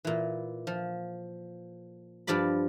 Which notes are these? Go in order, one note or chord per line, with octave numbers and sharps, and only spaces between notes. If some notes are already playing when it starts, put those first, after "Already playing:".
A#2 E3
F3
G2 F3 F4 D5 B5